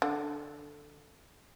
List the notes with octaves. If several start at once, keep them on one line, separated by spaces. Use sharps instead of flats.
D3